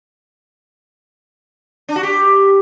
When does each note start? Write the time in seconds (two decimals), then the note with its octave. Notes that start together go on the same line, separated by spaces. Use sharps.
1.89 D4
1.96 F#4
2.03 G4